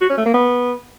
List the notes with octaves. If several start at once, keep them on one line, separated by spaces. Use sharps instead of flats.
F#4
C#4
A3
A#3
B3